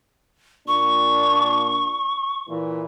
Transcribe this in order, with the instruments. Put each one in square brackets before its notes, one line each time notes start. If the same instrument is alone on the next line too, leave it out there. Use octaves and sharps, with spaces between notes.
[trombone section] A#2 D4 [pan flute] C#6
[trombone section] A#2 E3